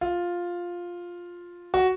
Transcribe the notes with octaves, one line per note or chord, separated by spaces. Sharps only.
F4
F#4